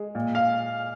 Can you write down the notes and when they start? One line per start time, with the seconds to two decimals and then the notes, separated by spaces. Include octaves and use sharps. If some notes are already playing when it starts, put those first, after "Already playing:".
Already playing: G#3
0.15 A#2
0.35 F5